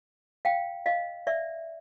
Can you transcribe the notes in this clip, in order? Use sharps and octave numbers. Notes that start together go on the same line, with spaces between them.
F5 G5
D#5 F5
D5 E5